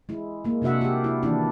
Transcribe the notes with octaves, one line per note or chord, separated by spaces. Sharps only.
G#3 E4
G#3 A#3
C3 D4 F#4 E5 F#5
F4 G4
E4
D#3 E3 A#3 D4 E4